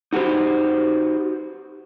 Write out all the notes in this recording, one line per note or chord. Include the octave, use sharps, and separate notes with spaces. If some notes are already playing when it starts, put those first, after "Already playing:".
D#4 F#4 G4 B4 C5